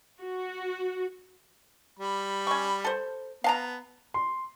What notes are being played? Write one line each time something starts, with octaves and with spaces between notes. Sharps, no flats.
F#4
G3 B5
C#4 C#6
A4 C5
B3 F5 A5 A#5
C6